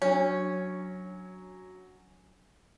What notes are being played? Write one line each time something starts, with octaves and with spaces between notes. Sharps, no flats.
F#3 C#4 D4 C#5